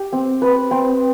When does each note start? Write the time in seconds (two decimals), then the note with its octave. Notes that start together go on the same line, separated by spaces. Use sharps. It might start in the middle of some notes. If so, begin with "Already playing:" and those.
Already playing: G4
0.12 C4
0.42 B4
0.71 C4